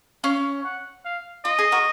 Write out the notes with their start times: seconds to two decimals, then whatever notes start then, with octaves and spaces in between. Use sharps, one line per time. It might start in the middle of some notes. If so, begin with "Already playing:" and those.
0.24 C#4 F5
0.64 F#5
1.05 F5
1.45 F4 D#5
1.59 G#4
1.72 F#4 A#4